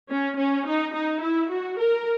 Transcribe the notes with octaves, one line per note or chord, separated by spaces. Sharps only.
C#4
C#4
D#4
D#4
E4
F#4
A#4